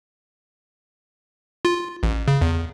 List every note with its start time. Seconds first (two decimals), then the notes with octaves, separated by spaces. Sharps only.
1.65 F4
2.03 A1
2.28 C#3
2.42 E2